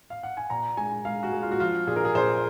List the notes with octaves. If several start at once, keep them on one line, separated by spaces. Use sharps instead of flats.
F5
F#5
G#5
A#2 A#5
G#3 G#5
G#3 F5
F#4
G#3
F4
F#4
F3 F4
A#2 G#4
A#4
G#4
A#2 C5